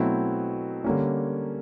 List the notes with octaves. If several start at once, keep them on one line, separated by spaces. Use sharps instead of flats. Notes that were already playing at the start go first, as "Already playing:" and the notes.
Already playing: B2 F#3 A3 C4 E4
D3 G3 A#3 C#4